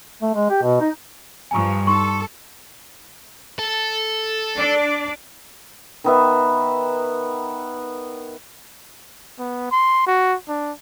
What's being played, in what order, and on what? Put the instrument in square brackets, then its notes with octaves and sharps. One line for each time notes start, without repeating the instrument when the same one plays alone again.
[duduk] A3
G#3
G4
B2
D#4
[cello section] G2 F3 [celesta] G#5 A#5 C#6
[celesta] D#4 C6 C#6 [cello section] A4
[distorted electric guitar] A4
[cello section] D4 D5
[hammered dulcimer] D#3 B3 E5
[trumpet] B3
C6
F#4
D4